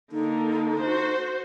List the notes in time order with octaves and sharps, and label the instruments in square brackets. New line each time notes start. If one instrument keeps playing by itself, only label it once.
[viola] D3 A#3 [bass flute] D#4
[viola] F#4 C5